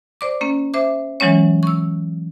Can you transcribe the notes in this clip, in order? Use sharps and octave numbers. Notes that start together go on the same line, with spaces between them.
C5 D5 D6
A#3 C#4
C5 E5 D6
E3 F#3 G#3 C#4 C#5
C#6 E6